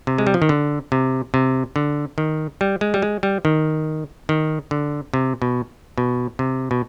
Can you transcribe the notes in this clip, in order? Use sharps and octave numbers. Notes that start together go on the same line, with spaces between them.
C3
G#3
G3
F3
D#3
D3
C3
C3
D3
D#3
G3
G#3
G3
G#3
G3
D#3
D#3
D3
C3
B2
B2
C3
B2